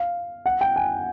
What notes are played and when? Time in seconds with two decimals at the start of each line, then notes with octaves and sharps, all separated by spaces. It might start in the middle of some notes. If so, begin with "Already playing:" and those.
Already playing: F5
0.46 F#5
0.61 G5
0.76 G#5